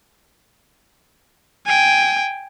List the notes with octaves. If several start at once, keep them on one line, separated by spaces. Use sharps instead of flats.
G5 G#5